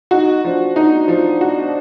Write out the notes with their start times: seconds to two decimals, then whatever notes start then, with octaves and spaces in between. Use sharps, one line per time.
0.11 D#4 F#4
0.44 F3 D4
0.76 D4 D#4
1.08 F3
1.41 F#4